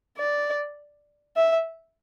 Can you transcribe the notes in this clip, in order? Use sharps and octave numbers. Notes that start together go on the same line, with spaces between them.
D5
E5